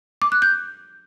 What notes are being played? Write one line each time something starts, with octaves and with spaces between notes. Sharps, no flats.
D6
F#6
G6